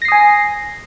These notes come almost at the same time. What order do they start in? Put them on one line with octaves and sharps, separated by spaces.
A#6 C7 D#6 G#5